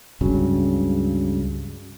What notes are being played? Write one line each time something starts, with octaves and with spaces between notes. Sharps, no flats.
C#2 G2 C#3 F#3